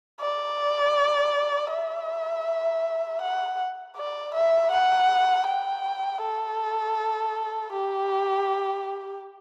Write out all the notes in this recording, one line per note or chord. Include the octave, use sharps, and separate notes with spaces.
D5
E5
F#5
D5
E5
F#5
G5
A4
G4